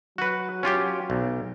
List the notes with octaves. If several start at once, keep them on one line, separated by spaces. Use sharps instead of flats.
F#3 F#4 B4
C#4 F4 G4
B1